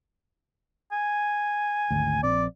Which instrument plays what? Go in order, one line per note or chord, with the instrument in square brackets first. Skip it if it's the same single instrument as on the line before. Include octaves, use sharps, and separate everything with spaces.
[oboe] G#5
[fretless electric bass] G#1 D2
[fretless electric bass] A#1 C4 [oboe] D5